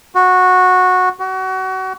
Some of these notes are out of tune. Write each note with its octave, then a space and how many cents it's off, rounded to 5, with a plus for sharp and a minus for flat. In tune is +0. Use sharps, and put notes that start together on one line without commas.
F#4 -10
F#4 +30